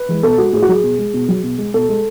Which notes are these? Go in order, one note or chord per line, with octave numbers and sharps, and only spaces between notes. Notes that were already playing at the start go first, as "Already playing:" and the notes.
Already playing: B4
E3 G#3
B2 A4
G#3 F#4
A2 G#4
F#4
F#3 G#4
B2
G#3
B2
F#3
B2
G#3
B2 A4
G#3